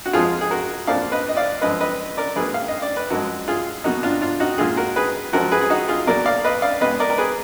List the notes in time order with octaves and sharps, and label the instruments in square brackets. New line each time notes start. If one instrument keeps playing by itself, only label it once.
[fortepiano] F#4
F2 F3 G#3 F4 G#4
G#4
F#4 A#4
F2 F3 A#3 D5 F5
B4 D#5
D#5
D5 F5
F#2 F3 G#3 B4 D#5
B4 D#5
A#4 D5
G#2 F#3 A#3 G#4 B4
F5
D#5
D5
B4
F#2 F3 G#3 F#4 A#4
F4 G#4
B2 F#3 A#3 D#4 F#4
D4 F4
D4 F4
D#4 F#4
A#2 G#3 F4 G#4
F#4 A#4
G#4 B4
F#2 F3 G#3 F#4 A#4
G#4 B4
G#4
D#4 F#4
F4 G#4
B2 F#3 A#3 A#4 D5
D5 F5
B4 D#5
D5 F5
B2 G#3 B4 D#5
A#4 D5
A#4
G#4 B4